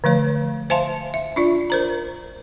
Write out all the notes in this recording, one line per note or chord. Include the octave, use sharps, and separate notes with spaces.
D3 F3 A3 C#5
C5 E5 F5 G#5 A5 C6
E5
D4 F4 D5
A#4 C5 A#5